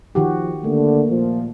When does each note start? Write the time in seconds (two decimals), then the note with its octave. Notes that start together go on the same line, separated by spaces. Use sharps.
0.15 D#3 F3 F#4 G4
0.64 D3 A3 A#3
1.10 A#2 F3